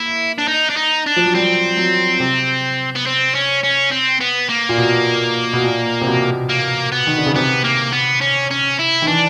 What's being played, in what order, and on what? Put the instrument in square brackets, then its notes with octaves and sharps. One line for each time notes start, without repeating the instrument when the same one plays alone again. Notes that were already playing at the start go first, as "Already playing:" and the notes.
Already playing: [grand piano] A#3 [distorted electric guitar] E4
[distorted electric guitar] D4
D#4
D4
D#4
D4
[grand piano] F3
F#3
[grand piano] G3 [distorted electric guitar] C4
[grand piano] F#3
C3
[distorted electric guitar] B3
C4
C#4
C#4
C4
B3
A#3
[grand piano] A#2
B2
B2
A#2
C3
B2
[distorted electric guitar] A#3
B3
[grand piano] D#3
D3
C#3
[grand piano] C3 [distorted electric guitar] B3
[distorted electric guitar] A#3
B3
C#4
C#4
E4
[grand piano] D#3
[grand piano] E3 [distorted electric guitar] D4